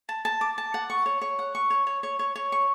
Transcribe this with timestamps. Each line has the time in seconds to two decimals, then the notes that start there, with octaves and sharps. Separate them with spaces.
0.09 A5
0.25 A5
0.41 D6
0.58 A5
0.74 F#5
0.90 C#6
1.06 C#5
1.22 C#5
1.39 F#5
1.55 C#6
1.70 C#5
1.87 C#5
2.03 C#5
2.19 C#5
2.36 C#5
2.52 C#6